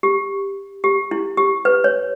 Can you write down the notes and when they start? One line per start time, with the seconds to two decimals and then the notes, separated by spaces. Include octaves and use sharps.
0.03 G4
0.84 G4
1.11 E4
1.37 G4
1.65 B4
1.84 C#5